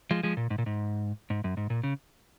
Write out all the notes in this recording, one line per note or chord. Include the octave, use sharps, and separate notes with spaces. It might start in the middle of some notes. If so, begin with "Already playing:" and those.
F3 G#3
F3 G#3
A#2
G#2
A#2
G#2
G#2
F#2
G#2
A#2
C#3